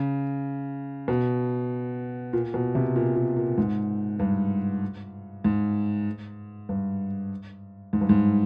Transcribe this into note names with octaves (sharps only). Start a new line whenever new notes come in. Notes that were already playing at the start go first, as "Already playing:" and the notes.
Already playing: C#3
B2
A#2
B2
C3
A#2
A#2
A#2
G#2
G2
G#2
G2
G#2
G2
G#2